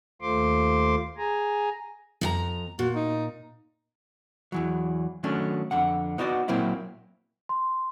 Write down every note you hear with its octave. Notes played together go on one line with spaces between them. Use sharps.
D#2 A3 F4 C5 C6 D6
G#4 G#5 A#5
F2 F#4 A#5
A#2 F#4
D#4
E2 E3 F#3
D#3 F#3 A3 C#4 D4
F2 D3 F#5
B3 D#4 F#4 C#5 D5
A#2 F#3 A#3 C4 E4
C6